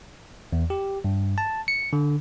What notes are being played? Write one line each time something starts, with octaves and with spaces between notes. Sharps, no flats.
E2
G4
G2
A5
C#7
D3